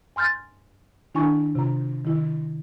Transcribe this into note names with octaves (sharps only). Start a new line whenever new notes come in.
G#5 C6 F6 G6 A6
D#3 D4 E4 G#5 C#6
C3 F4 A#5
D#3 E4